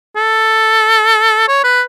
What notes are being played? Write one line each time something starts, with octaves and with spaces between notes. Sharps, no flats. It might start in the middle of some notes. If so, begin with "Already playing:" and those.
A4
C#5
B4